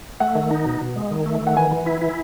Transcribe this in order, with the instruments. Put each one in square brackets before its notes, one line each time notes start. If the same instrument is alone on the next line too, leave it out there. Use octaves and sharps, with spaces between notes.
[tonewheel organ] A3 [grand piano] F#5
[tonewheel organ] D#3
D#4
B2
B2
G#3
D#3
A3
D#3
[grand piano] F#5
[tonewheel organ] E3 [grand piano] G#5
[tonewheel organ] E3
E4
E4